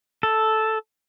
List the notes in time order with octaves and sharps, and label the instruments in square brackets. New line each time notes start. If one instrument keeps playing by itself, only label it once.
[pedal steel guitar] A4